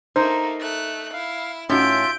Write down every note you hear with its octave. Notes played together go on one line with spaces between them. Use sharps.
A3 A#3 D#4 C5
A3 F#6
E4 F5
A2 C#4 D#4 F4 F#4 E5 G6 D7